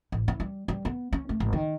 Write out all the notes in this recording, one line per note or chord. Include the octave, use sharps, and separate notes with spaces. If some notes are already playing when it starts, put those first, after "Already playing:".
A1
E4
G3
G3
B3
C#4
A3
G#1
D#3